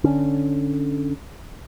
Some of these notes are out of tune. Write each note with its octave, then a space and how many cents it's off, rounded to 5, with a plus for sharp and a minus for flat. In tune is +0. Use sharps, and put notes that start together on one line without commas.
D3 +0 C#4 +0